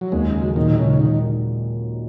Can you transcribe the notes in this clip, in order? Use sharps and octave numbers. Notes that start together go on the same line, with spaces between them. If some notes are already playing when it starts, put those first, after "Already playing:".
F#3
D#2 G#3
C#3
F#3
A#2 D#3
G#3
C#3
D#4
D#3